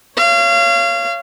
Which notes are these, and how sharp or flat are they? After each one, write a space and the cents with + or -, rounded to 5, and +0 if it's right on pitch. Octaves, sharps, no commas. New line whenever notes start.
C#5 +0 F5 -30